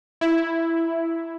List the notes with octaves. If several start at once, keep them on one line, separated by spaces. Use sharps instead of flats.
E4